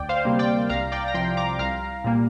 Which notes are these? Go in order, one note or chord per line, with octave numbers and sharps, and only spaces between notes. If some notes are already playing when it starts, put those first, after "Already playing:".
Already playing: D2 D5 G5
C5 F5
C3 G3 A#3
D5 G5
C2 F5 A#5
D5 G5
A#5
C3 F3 G5 C6
A#5 D6
C2 F5 A#5
A#2 G3 A#3